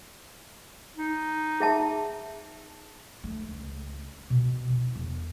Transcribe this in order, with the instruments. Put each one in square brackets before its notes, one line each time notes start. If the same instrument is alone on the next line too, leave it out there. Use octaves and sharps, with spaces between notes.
[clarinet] D#4
[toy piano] G#4 E5 A5
[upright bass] A3
C#2
B2
E4
E1